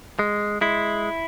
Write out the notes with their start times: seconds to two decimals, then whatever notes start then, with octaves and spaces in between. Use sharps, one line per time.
0.19 G#3
0.61 G#3 E4